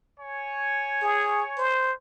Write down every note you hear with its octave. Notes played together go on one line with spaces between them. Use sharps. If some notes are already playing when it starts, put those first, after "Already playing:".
C#5 G#5
G#4
C5